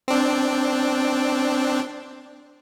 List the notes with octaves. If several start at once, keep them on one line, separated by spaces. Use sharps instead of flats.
C4 D4